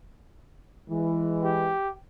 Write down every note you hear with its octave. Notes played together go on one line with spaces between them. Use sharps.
E3 G#3
G4